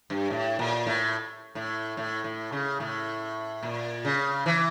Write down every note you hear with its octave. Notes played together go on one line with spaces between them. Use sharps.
G2
A2
A#2
A2
A2
A2
A2
C#3
A2
A#2
C#3
E3